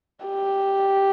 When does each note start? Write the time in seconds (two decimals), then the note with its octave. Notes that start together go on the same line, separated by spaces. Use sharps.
0.25 G4